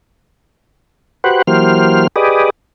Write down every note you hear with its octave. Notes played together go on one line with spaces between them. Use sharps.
F#4 G4 B4 C5 F#5
E3 F#3 A#3 G4 C5 F6
G4 G#4 B4 D5 D#5